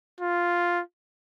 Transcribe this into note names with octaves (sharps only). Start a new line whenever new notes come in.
F4